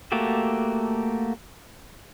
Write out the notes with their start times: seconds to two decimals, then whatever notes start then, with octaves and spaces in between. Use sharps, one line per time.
0.12 A3 A#3 F#4 G4 A4